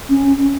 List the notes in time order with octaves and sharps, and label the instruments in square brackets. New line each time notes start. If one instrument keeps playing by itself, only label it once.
[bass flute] C#4